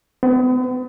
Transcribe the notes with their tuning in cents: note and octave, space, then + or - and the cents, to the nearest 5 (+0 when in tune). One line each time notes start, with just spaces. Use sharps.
B3 +40